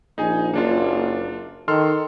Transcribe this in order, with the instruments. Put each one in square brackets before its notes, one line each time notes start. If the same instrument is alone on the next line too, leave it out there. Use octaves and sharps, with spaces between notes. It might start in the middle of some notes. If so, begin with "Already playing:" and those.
[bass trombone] A#1 [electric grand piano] D#4 G#4 G#5
[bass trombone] F#1 [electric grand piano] A#3 D4 F4
[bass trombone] D#3 [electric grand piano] A4 C6 F6